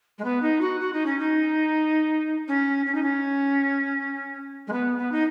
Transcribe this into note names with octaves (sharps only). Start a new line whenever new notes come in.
G#3
B3
D#4
F#4
F#4
D#4
C#4
D#4
C#4
C#4
D#4
C#4
G#3
B3
B3
D#4